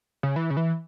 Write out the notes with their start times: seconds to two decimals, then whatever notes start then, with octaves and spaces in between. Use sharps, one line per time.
0.23 C#3
0.36 E3
0.50 C#3
0.57 E3